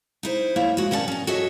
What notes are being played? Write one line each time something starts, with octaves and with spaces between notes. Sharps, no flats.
D#4 E4 C5
A#3 E4 C#5
G#3 F#4
D#3 C#4 E4 D5 A5
C#4 D#5
F#4 A4 C#5 D#5 E5